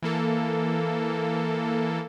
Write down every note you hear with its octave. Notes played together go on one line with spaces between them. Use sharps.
E3 A#3 A4